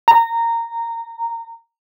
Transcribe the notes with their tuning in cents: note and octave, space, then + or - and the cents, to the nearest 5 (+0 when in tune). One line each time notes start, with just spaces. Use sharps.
A#5 -15